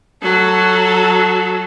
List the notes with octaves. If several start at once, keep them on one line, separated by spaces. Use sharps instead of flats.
F#3 A4